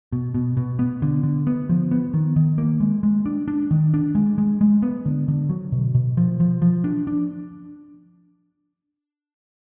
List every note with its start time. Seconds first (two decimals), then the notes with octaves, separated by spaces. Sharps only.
0.12 B2
0.35 B2
0.57 B2
0.79 B3
1.02 D3
1.23 D3
1.47 B3
1.69 F3
1.91 B3
2.14 D#3
2.36 D#3
2.58 A#3
2.80 G#3
3.03 G#3
3.26 D4
3.48 D4
3.71 D#3
3.94 D4
4.15 G#3
4.38 G#3
4.61 G#3
4.83 B3
5.06 D3
5.28 D3
5.49 F#3
5.72 B2
5.95 B2
6.17 F3
6.40 F3
6.62 F3
6.84 D4
7.07 D4